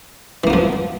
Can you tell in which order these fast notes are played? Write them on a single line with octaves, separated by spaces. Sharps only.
E3 A#3 B3 F3